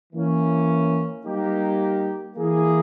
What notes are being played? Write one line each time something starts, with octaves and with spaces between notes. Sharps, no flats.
E3 A#3 C#4
G3 A#3 D#4 G4
E3 A#3 E4 G#4